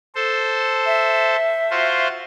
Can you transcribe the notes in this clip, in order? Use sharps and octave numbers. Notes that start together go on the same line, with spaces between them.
A4 C5
E5
F4 F#4 C5